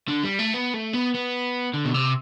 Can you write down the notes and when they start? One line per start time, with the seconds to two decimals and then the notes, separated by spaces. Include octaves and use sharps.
0.08 D3
0.24 G3
0.39 A3
0.54 B3
0.74 A3
0.93 B3
1.14 B3
1.74 D3
1.85 B2
1.94 C3